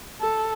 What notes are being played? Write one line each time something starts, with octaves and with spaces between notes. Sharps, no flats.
A4